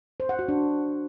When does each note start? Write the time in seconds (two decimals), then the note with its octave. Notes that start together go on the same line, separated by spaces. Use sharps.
0.20 C5
0.29 F#5
0.39 F#4
0.49 D4